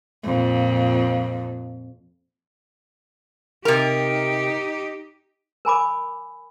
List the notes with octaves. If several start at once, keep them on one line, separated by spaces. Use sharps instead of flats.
F2 A#2
C3 D#4 G4 A#4
A#4 G#5 B5 D6